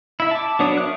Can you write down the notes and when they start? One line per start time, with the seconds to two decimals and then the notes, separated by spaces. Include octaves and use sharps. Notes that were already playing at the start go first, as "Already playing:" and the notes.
0.20 E4 E5
0.31 A5 D6
0.59 F#3 B3 D4 C#5 D#6
0.77 A#4 E5 F#6